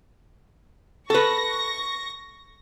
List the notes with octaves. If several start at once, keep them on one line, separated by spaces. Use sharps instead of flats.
A4 B4 C#6 A#6